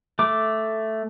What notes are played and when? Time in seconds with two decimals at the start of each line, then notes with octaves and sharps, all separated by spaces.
0.19 A3 D6